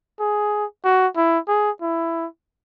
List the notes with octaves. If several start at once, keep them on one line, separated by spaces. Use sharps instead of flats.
G#4
F#4
E4
G#4
E4